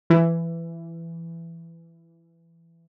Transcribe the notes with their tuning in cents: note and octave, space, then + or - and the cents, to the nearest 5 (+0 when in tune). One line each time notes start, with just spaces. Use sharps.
E3 +15